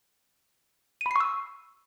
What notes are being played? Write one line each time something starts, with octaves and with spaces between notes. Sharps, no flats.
B5 C#6 E6 C7 D#7